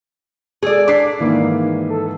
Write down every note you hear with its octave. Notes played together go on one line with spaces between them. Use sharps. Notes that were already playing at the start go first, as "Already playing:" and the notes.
G#3 G#4 A4 D5
D4 D6 B6 C7
G#2 D#3 E3 A#3
A4